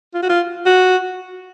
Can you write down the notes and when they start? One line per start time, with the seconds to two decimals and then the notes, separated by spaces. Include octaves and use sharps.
0.14 F4
0.23 F#4
0.30 F4
0.66 F#4